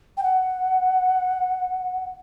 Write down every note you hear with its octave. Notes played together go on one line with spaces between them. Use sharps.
G5
F#5